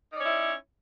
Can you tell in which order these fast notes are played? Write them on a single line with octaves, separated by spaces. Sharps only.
D#4 D5 C#4 C#5 E4